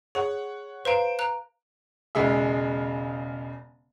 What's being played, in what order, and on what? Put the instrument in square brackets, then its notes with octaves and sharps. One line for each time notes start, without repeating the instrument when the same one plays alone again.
[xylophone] G#4 [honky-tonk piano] C#5 F#5
[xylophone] B4 F5 A#5 [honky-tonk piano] C5 D7
[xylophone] A#5 F#6
[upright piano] E1 C#3 G#3 E5